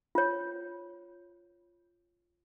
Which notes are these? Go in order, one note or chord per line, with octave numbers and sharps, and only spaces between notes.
F4 C#5